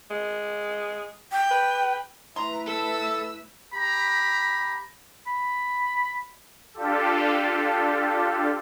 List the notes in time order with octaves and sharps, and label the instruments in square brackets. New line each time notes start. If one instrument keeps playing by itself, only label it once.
[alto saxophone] G#3
[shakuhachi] G5
[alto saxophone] B4
[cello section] A3 E4 B4 [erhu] A#5 [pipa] C6
[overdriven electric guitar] A4 [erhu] E6
[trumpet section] G4 A#5 B5
[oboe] B5
[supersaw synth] D4 F4 G4 A4